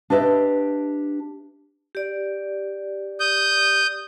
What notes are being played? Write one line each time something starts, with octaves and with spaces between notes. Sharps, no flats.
D4 G4 B4 D#5 E5
G4 D5
D#6 G6